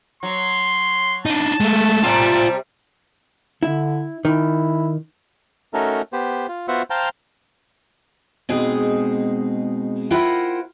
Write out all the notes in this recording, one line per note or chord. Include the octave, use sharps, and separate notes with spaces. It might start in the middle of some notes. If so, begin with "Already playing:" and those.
F#3 C6
D4 D#4 A5
G#3 A3
C3 G3 F4 D5
D3 E4
D#3 E4
A3 C#4 D#4 F#4 A4 A#4
B3 G4 C5
F4
B3 F4 F#4 C5 E5 F#5
C5 F5 G5 A5 A#5 C6
B2 G#3 C4 D#4 G#4
E4 F4 A#4 C5 F#5 G5